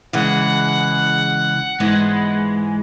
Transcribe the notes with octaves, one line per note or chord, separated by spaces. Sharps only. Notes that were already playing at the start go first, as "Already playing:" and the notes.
C#3 E3 G#3 F#5
G#2 E3 G#3 B3